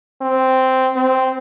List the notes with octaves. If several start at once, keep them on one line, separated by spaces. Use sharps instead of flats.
C4
C4